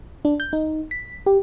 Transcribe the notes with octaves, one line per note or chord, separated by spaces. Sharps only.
D4
G6
D#4
B6
G4